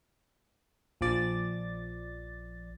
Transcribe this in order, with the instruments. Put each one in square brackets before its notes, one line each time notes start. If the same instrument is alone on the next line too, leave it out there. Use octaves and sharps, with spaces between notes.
[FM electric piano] A#1 F3 D5 A6